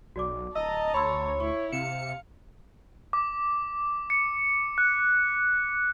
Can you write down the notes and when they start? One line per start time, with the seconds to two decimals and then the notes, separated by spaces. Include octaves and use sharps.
0.16 B1 F#4 D5 D6
0.55 D1 D#5 A5 A#5 E6
0.94 D2 C#5 B5 C6 E6
1.40 E4 C#6
1.72 C3 F5 C#7 E7
3.13 D6
4.10 C#7
4.78 F#6